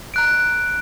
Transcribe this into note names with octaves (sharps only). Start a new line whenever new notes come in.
A#5 F#6 D7